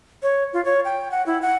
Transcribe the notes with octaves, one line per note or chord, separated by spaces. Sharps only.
C#5
F4
C#5
G5
F#5
E4
F#5